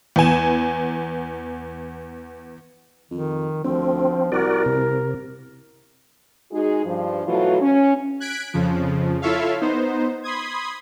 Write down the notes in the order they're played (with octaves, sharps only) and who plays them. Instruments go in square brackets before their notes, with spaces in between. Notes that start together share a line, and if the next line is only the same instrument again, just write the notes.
[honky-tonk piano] E2 B3 G#5 E7
[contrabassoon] F2 [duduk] D#3
[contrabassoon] D2 [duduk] F3 [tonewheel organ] C4
[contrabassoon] C2 [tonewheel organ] F#4 D5 [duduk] A#4
[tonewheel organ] C3
[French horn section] G#3 D#4 F#4 G#4
G2 F3
B2 E3 F#3 A3 F4 F#4
C#4
[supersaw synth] F#6 G#6 B6 D7
F2 C#3 F3
E4 F4 A4 C#5 E5 F5
B3 D#4 C5
B5 C6 D#6 G#6